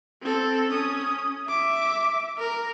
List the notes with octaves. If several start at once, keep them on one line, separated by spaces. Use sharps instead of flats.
C4 A4
C#4 D#6
E5 D6
A#4